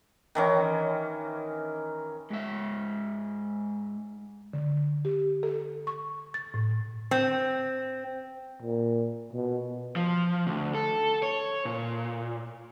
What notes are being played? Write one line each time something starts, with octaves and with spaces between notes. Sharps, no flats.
D#3 E3 C#4
G#2 E5
D3
G4
A4
C#6
A6
A2
C4
A#2
B2
F3
D2
A4
C#5
A#2